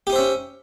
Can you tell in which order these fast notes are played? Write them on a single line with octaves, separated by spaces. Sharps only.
G4 D#4 C5 E5 C#4